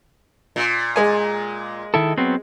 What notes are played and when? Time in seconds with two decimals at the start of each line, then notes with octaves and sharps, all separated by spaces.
0.56 A#2
0.96 G#3 G#5
1.94 D#3 E4 A4
2.18 F#3 B3 C4